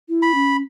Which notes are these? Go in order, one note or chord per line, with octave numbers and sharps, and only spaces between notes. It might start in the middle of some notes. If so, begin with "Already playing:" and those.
E4
B5
C#4